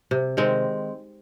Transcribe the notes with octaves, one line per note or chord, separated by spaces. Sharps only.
C3
D#3 G#3 C4